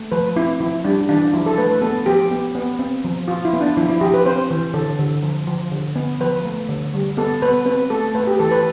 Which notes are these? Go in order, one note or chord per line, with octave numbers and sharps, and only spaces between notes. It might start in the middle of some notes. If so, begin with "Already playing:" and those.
Already playing: A3
F3 B4
C4 E4
F3 E4
G3 D4
E3 D4
F3 E4
A4
A3 B4
B4
B3 A4
F3 G4
B3
B3
C4
F3
F3 F4
E4
B3
D4
F3 E4
E4
F3 G4
B4
C4 C5
E3
D3 A4
D3
F3
F3
D3
B3
F3 B4
A3
D3
G3
B3 A4
B3 B4
C4 B4
A3 A4
A3 B4
G4
E3 A4
B4